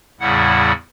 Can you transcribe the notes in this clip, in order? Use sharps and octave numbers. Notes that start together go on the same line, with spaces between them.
E2 A2 C#3 G3 E4 F#5